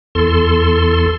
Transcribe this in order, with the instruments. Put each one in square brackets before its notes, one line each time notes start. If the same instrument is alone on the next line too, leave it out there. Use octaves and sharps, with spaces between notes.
[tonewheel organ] E2 A4 C6